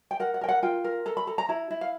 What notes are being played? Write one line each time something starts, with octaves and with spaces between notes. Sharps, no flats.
G5
A#4 F#5
F#5
A#4 G5
F#5
F4 G5
A#4
A4 A#5
B5
A4 A#5
A#5
E4 A#5
E4
F5